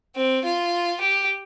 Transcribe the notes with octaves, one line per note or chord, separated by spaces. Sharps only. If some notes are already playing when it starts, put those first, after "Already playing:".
C4
F4
G4